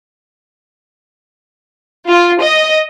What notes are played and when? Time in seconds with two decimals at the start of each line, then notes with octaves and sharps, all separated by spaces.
2.08 F4
2.41 D#5